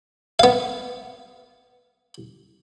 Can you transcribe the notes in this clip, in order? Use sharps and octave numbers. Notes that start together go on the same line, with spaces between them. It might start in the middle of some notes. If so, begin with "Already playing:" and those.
B3 F5